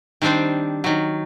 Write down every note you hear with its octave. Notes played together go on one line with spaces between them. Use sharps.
D#3 G3 C4 D4 C5
D#3 F#3